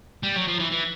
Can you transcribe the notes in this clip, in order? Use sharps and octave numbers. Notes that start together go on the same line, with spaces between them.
G3
F#3
F3
E3
E3